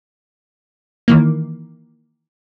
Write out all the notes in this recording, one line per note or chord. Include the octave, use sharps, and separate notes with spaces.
D#3 E3 A#3